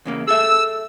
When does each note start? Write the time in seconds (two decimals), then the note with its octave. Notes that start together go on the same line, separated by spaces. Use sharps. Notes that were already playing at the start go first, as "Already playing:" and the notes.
0.05 E2 C#3 A#3
0.27 G#4 A4 E5 E6